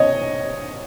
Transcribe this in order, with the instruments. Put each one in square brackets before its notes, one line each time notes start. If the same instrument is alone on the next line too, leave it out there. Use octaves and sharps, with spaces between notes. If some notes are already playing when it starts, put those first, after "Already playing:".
Already playing: [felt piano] C#5 D#5